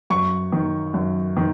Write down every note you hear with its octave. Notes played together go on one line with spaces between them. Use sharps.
F#2 C#6
D#3
F#2
D#3